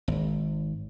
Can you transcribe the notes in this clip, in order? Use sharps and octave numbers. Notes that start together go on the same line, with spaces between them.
G#1